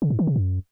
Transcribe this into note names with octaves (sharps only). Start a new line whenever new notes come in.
C#3
G#2
D#3
C3
F#2